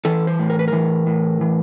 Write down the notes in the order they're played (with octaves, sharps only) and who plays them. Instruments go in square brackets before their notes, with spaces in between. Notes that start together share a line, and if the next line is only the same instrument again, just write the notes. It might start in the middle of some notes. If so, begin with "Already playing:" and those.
[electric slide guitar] E3 A4
C5
A2
A#4
B4
A#4
E3
A2
E3